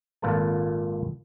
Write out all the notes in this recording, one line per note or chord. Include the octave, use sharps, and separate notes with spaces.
G#1 A#2 F4 A4 B4 A5